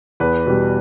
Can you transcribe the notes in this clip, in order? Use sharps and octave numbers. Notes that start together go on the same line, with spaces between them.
E2 B4
B2 G3